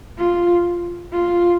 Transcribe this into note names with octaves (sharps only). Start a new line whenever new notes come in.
F4
F4